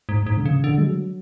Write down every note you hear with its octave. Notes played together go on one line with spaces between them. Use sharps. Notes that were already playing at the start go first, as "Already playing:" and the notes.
G#2
G#2
D3
C#3
D3
G#3
F#3